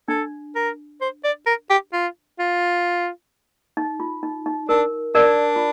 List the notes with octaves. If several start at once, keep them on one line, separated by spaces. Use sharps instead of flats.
D4 A4
A#4
C5
D5
A#4
G4
F4
F4
D#4
F4
D#4
D#4
D4 A#4
D4 A#4 D5
F4